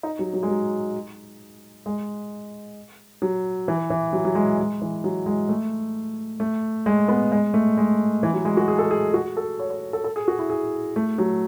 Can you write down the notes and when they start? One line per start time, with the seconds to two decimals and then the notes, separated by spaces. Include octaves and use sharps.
0.03 D#4
0.19 F#3
0.34 F#3
0.43 G#3
0.49 F#3
1.86 G#3
3.22 F#3
3.68 E3
3.90 E3
4.13 F#3
4.25 F#3
4.35 G#3
4.58 G#3
4.82 E3
5.04 F#3
5.26 G#3
5.49 A3
6.40 A3
6.86 G#3
7.08 B3
7.32 G#3
7.54 A3
7.78 G#3
8.23 E3
8.33 F#3
8.45 G#3
8.57 F#4
8.68 G#4
8.79 A4
8.91 G#4
9.14 F#4
9.37 A4
9.60 C#5
9.70 C#5
9.93 A4
10.04 A4
10.16 G#4
10.28 F#4
10.39 E4
10.50 G#4
10.96 A3
11.18 F#3